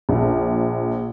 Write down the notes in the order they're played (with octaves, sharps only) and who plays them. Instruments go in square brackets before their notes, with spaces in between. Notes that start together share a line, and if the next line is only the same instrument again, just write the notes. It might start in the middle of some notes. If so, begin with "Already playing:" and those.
[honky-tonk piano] A#1